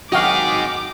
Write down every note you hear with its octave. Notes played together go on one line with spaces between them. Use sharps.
D#3 F#3 C4 D#4 F#4 G#4 F5 D6